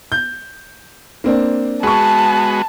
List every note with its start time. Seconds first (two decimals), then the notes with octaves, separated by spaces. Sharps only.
0.12 G6
1.24 A#3 C4 D4
1.83 G#3 B3 F#4 G#4 A5 C#6